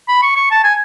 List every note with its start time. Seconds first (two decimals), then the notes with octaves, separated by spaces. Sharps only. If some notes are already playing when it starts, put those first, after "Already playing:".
0.08 B5
0.22 C#6
0.36 C#6
0.51 A5
0.64 G#5